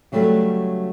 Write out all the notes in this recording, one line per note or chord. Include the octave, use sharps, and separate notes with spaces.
C#3 F#3 G3 A3